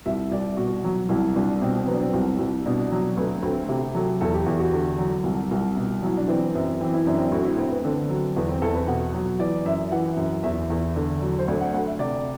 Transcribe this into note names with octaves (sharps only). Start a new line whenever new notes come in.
C2 E5
C2 D5
B2 F#4
F#3
C2 E4
C2 D4
B2 C4
C4
F#3 B3
D4
C4
C2
C2
B2 D4
F#3
D2 B3
D2 C4
C3 G4
F#3 A4
E2 A4
G4
E2 G4
F#4
D3
F#3
C2
C2
B2
F#3 E4
D4
E3 C4
F#2 B3
E3 C4
E4
F#2 D4
C4
D2 F#4
E4
D2 C4
B3
D3 C4
F#3
E2 B3
C4
E2 A4
B4
B2 F#5
F#3
E3 D5
F#2 E5
E3 F#5
F#2
E2 E5
E2
D3
F#3
C5
D2 D5
F#5
D2 F#5
E5
C3 D5